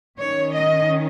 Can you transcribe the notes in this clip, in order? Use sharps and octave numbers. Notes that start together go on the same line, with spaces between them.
D#3 C#4 C#5
D#5